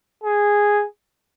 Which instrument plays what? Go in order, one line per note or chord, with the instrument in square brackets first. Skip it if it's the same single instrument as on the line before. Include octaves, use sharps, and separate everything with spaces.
[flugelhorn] G#4